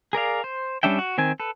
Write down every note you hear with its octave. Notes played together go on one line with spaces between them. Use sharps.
G#4 A#4 D5 F5
C5
G3 C#4 D4 E5 G5
F#4
D#3 C4 G#5
A4 B4